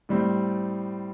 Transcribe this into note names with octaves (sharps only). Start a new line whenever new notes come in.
A2 G3 C4